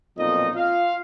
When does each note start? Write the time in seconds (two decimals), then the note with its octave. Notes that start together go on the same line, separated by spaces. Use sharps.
0.18 B1 F2 A#2 D#4 D#5
0.56 F4 F5